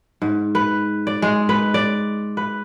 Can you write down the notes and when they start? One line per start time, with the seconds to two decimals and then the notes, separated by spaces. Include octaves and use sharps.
0.22 G#2
0.55 B4
1.07 D5
1.22 G#3
1.49 B4
1.74 D5
2.37 B4